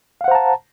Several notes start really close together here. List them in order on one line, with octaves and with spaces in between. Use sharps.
F5 F#5 C5 A#5 A5